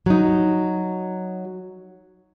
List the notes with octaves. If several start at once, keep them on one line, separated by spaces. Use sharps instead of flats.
F#3 D#4